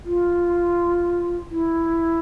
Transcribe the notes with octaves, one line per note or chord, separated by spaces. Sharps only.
F4
E4